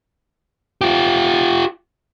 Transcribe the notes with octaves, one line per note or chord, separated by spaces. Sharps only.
F4 G4